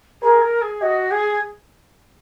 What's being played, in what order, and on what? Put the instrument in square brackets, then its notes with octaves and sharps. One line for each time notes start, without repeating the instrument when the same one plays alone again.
[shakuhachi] G#4 [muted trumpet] A#4
[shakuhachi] A#4
G#4
[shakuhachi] F#4 [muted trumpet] D#5
[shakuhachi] G#4